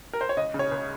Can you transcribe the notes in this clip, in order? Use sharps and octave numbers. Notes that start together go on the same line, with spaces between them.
A#4
C5
C#5
C#2 D#5
C#3
C#5
C#2